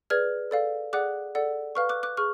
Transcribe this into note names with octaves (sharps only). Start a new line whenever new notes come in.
G#4 B4 D5 F6 G#6
A4 D5 F5
G#4 D5 F#5 D6 F#6
A4 D5 F#5
B4 F5 C#6 F6
D6 F#6
D6 F#6
G#4 C#6 F6